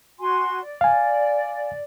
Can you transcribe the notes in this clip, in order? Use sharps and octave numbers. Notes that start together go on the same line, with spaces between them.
F#4 G#5 C6
D5
F5 G#5